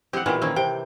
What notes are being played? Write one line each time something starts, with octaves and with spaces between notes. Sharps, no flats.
E3 G#3 C4 G4 F#5
A#2 D#3 E3 B3 C4 G4
D#3 A#3 C4 C#4
C3 G5